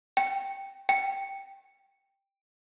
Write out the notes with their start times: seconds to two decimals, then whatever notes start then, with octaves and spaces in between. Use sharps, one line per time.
0.17 G5
0.89 G5